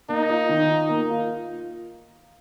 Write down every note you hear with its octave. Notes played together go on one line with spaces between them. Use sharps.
A#3 D#4
F4
D#3
F4
A#3
F4